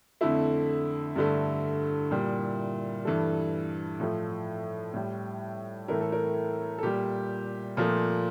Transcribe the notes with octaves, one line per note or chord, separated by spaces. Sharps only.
F2 D3 A3 E4
G2 D3 A3
A#2 G3
G2 E3 A3 A4
A2 F3 A3
A2 G3
A2 E3 A3 A#4
A4
A#4
A4
A#2 G3 G4
A#2 F3 A3